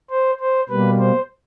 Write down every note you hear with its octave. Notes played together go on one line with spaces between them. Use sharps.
C5
C5
B2 G3 A#3 B4
C5